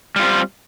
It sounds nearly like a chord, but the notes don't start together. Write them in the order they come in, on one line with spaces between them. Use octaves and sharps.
G3 F4 C4